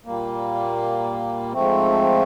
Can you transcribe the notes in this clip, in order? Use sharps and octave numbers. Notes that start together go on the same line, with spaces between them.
A#2 G3 A#3
G#2 F3 A3 C4